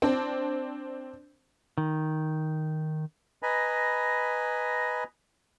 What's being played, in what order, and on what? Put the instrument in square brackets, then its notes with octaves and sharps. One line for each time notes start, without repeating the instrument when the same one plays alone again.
[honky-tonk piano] C4 D4
[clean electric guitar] D#3
[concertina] B4 D#5 G#5 A#5 B5